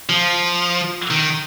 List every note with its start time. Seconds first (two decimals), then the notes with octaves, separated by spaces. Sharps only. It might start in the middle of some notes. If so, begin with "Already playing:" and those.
0.09 F3
1.11 D#3